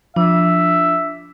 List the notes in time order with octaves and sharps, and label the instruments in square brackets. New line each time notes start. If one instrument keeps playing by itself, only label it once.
[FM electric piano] F3 [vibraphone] D4 [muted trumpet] E5